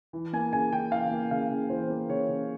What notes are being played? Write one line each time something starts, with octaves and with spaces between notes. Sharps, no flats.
E3
A#3 G#5
C#3 G#5
C#3 G5
E3 F5
A#3
C#3 F5
C#3
E3 C5
A#3
C#3 C#5
C#3